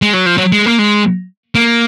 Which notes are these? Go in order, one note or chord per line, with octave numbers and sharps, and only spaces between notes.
G#3
F#3
F3
F#3
G#3
A#3
G#3
A#3